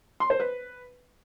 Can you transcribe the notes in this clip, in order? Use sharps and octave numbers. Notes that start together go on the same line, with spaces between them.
C6
C5
B4